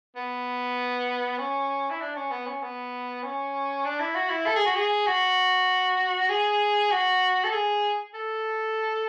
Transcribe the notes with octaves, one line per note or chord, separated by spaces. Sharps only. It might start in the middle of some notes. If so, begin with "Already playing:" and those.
B3
C#4
E4
D4
C#4
B3
C#4
B3
C#4
D4
E4
F#4
E4
A4
G#4
F#4
G#4
F#4
G#4
F#4
A4
G#4
A4